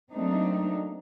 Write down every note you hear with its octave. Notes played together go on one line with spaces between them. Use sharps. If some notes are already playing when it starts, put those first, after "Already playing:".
F#3 A3 A#3 C4 D4 D#4